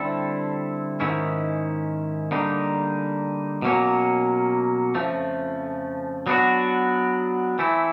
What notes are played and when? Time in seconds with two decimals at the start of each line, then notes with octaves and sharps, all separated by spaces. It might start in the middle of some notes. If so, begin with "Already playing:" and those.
Already playing: D3 G3 C4 E4 A4
1.00 G#2 D#3 G#3 C#4 E4
2.31 D3 G3 A#3 D#4
3.62 B2 F#3 A#3 C#4
4.95 F2 C#3 F3 A3
6.27 F#3 B3 D4 F#4
7.59 E3 A3 C4 E4